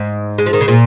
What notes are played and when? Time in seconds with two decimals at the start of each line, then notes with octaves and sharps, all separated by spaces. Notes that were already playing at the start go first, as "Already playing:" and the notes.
Already playing: G#2
0.38 G#3
0.46 F3
0.53 D#3
0.61 C#3
0.68 A#2